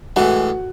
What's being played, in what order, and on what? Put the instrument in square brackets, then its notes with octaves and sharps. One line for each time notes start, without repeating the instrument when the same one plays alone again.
[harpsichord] A2 E3 G#3 [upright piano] F#4 F#5